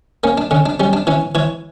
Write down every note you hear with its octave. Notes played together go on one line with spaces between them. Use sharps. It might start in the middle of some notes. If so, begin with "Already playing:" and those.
A#3 C#4
D4
D3 C#4
D4
G3 C#4
D4
E3 C#4
E3 C#5